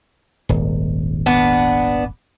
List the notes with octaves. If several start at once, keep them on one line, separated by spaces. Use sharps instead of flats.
D#1 G#1
B3 D4